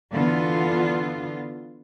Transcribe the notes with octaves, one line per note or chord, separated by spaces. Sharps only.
D3 E3 B3 F4